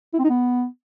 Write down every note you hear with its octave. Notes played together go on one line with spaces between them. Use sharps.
E4
C4
D#4
B3